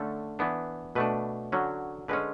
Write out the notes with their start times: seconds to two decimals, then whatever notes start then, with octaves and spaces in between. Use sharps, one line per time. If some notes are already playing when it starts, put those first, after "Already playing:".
Already playing: D3 A3 C#4 A4
0.39 E3 B3 D4
0.95 B2 A3 D4 B4
1.52 D3 F#3 C#4
2.08 D3 G#3 C#4 B4